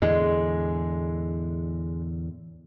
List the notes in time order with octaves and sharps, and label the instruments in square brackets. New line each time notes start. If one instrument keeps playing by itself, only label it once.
[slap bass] E2 A2 D3 [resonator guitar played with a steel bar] G#3